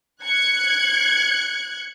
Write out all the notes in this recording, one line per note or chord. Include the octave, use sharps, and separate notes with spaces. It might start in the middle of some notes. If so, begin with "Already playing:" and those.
F#6 G#6 C#7